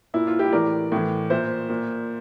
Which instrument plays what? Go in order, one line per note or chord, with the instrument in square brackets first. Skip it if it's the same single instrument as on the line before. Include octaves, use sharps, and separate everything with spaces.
[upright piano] A#2 E4
F4
E4 G4
A2 E3 A#4 D5
A2 E3
A#2 C5 E5
A#2